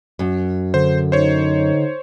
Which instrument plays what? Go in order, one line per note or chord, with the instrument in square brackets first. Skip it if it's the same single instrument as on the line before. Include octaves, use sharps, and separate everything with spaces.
[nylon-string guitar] F#2
[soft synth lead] D3 [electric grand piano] C5
[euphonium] D#4 [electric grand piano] C5 C#5